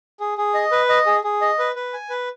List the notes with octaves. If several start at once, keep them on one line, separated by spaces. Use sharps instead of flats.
G#4
G#4
D#5
B4
D#5
G#4
G#4
D#5
B4
B4
G#5
B4